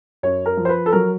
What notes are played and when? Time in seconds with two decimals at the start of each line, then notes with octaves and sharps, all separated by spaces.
0.23 F#2 C#5
0.46 A#4
0.57 F3
0.65 C5
0.69 B4
0.86 A4
0.92 F#3 A#4